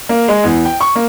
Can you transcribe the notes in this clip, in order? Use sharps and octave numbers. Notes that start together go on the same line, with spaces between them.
A#3
G#3
E2
G5
C#6
A#3